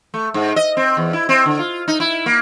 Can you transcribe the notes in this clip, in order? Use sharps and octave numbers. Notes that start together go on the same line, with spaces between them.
A3
G#2
D#5
C4
E2
E4
C4
D3
F4
D#4
E4
A#3